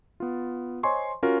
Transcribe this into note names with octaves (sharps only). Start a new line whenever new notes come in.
B3 F4
C5 C#5 D#5 G#5 C6 C#6
C#4 F4 F#4 A#4